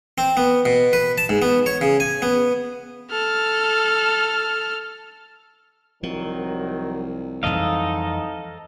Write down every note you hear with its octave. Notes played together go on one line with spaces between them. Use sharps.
C4
B3
B2
B4
A5
G#2
B3
C#5
C#3
G#5
B3
A4 F6
C2 D#3 F3 F#3
F2 G#2 E3 G3 D#4 A4 D#5 F5